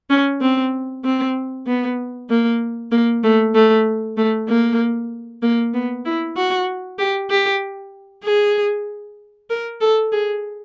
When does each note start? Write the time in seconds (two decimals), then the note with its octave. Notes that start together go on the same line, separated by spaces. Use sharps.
0.10 C#4
0.41 C4
1.04 C4
1.67 B3
2.30 A#3
2.92 A#3
3.23 A3
3.55 A3
4.17 A3
4.48 A#3
5.42 A#3
5.74 B3
6.05 E4
6.36 F#4
6.99 G4
7.30 G4
8.24 G#4
9.50 A#4
9.81 A4
10.12 G#4